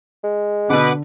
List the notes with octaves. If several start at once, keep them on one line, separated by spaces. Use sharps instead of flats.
G#3
B2 D3 B4 F#5 D6